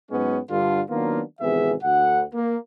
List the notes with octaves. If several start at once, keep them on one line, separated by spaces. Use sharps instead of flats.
G#2 F#3 G#3 B3 C#4
G2 D3 F4
D#3 F#3 A#3 B3 D4 F4
G#1 C3 E3 B3 G#4 E5
D2 F#5
A#3